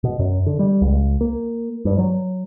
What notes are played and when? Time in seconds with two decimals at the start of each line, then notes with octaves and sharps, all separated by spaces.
0.04 B2
0.19 F#2
0.46 D3
0.59 G3
0.82 C#2
1.21 A#3
1.85 G2
1.98 F#3